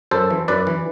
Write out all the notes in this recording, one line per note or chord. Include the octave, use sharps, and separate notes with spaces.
F#2 A4 C5
E3
F#2 B4 D5
E3